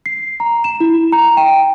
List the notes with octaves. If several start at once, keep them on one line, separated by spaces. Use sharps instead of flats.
C7
A#5
E7
E4
A#5
G5